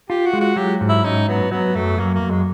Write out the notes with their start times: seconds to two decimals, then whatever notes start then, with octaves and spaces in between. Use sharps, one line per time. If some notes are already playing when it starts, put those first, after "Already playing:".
0.10 F4 G4
0.26 F#4
0.33 G#3
0.41 F#4
0.56 F#3 G4
0.81 G#2
0.89 E4
1.04 C#4 D#4
1.28 F#3 B3
1.51 F#3 B3
1.75 F#2 A3
1.98 F#3 A#3
2.14 A#3
2.22 F#2
2.30 G#3